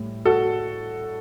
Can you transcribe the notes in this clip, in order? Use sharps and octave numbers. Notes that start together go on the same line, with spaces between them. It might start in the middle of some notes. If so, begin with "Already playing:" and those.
Already playing: A2 G3
F#4 A4